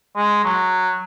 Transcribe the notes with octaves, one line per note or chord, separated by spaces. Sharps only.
G#3
F#3